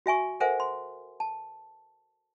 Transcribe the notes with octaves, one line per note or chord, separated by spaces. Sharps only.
F#4 E5 G#5 C#6
A4 A#4 C5 E5 F#5 G#5
C6
A5